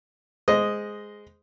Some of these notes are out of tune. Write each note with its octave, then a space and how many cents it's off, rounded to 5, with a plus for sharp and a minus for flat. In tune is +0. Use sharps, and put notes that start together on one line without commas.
G#3 +0 C5 -15 D#5 +0